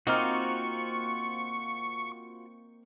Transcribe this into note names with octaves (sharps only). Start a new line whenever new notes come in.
A#3 C4 D#4 F4 F#4 F5 C#6